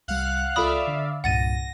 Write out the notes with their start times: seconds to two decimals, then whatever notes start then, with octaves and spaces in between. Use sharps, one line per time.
0.08 C2 G3 F5 F#5 F#6
0.56 C#2 F4 A4 D5 E5 F5 B5 D#6
0.87 D3
1.24 C2 G2 A#2 F#5 A6 A#6 D#7